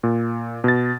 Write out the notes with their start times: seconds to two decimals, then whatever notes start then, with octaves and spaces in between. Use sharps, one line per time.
0.03 A#2
0.64 B2 A6